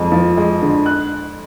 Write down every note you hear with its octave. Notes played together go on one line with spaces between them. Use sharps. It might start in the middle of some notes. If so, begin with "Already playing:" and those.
Already playing: F2 G#3
F3
G#3
D3
F#6